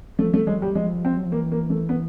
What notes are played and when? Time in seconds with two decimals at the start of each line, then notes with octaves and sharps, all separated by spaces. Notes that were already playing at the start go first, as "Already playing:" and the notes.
0.19 F3 A3
0.34 A3
0.47 F#3 G#3
0.62 G3
0.75 F3 G#3
1.05 C4
1.17 F#3
1.26 F3
1.32 E3 A#3
1.52 A#3
1.70 A3
1.89 B3